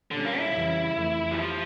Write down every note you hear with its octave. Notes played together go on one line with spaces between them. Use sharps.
A#2 D3 G3 C#4
A#3
E4
F2 C#3 E3 G3
F2 E3 A3
G3
F3 G4